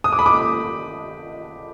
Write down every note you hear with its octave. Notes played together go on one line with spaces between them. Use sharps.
D#6
D6
B5
D6